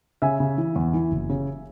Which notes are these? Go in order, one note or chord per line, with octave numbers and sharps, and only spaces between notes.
C#3 E5 G#5
C#3
E3
E2
E3
F#1
C#3